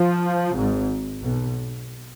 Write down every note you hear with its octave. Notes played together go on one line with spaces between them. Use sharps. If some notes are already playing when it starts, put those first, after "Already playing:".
Already playing: F3
G#1 G#2
B1 B2